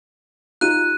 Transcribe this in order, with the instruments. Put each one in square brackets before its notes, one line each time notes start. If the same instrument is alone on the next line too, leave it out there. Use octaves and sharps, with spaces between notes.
[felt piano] D#4 F4 G4 [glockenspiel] F#6 D#7